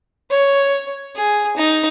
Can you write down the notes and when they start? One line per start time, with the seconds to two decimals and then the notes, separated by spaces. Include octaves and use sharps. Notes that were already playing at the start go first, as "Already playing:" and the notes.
0.30 C#5
1.15 G#4
1.57 D#4